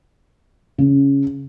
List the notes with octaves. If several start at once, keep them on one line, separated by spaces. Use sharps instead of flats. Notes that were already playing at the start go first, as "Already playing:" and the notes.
C#3